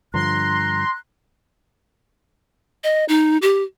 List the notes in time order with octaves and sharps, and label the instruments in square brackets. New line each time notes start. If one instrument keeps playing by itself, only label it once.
[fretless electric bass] G2 D3 F3 [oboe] A#5 [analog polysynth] C6 [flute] F#6
[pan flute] D#5
D#4
G4